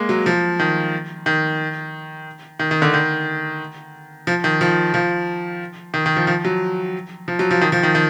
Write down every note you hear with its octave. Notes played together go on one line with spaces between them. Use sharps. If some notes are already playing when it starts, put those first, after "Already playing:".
Already playing: G#3 A#3
F#3
F3
D#3
D#3
D#3
D#3
D3
D#3
F3
D#3
F3
F3
D#3
D#3
F3
F3
F#3
F3
F#3
F3
D#3
F3
D#3
D#3